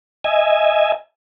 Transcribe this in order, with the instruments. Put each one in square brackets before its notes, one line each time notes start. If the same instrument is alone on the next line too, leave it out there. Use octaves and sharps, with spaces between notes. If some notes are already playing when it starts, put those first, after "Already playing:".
[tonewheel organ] D#5 E5 G#5